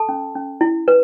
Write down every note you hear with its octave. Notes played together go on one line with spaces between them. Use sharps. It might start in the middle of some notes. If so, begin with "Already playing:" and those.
Already playing: A4 A5
C#4
C#4
E4
B4